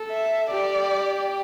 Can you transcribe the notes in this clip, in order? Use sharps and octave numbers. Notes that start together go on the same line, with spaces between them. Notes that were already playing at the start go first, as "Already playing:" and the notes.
Already playing: A4
E5
G4 D5